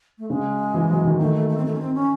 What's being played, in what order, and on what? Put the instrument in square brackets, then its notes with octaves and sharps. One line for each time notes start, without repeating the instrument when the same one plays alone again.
[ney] A3
[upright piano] C#3 [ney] G#3
[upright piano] E3
F#3
D#3
[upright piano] D#3 [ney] A3
[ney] A3
A3
C4
A3
C#4
C4
C#4